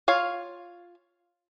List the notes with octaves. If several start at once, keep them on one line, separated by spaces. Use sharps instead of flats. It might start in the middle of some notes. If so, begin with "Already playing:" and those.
F4 C#5 F5